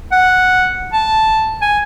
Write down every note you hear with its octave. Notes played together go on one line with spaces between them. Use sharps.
F#5
A5
G#5